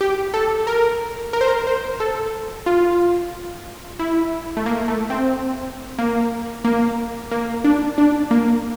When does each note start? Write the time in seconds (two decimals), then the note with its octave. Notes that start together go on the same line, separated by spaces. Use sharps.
0.01 G4
0.34 A4
0.67 A#4
1.33 A#4
1.41 C5
1.48 A#4
1.67 C5
2.00 A4
2.66 F4
3.99 E4
4.57 A3
4.66 A#3
4.88 A3
5.10 C4
5.98 A#3
6.65 A#3
7.31 A#3
7.64 D4
7.98 D4
8.31 A#3